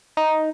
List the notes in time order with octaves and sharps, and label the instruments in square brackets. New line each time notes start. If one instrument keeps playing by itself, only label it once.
[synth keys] D#4